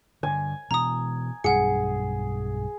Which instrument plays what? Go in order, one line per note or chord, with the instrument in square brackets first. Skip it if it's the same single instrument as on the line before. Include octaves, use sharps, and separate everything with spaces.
[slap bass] G2 D3 [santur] G#5
[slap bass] B2 E3 G#3 [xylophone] A#5 D#6
[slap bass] B1 G2 [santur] G#4 [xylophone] F#5 C#7